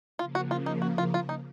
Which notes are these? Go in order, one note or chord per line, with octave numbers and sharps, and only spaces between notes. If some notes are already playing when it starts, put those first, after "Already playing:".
C#3 F3 A#3 F4
F#4
F4
D#4
F#4
F4
F4
D#4